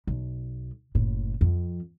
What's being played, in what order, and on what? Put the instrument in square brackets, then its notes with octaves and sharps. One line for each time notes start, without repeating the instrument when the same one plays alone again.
[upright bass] B1
F#1 A2
F2